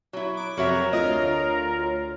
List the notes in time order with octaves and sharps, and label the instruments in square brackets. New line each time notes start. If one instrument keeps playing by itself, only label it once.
[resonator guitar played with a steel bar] F#3 E4
[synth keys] D6 D7
[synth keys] F2 C3 [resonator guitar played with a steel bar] F#3 F#4 E5 [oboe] A#4 [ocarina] C#5
[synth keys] D2 F4 [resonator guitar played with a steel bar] D#5